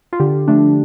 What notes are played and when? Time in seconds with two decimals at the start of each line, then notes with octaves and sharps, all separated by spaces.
0.13 F4
0.20 D3 G4
0.48 F3 A3 D4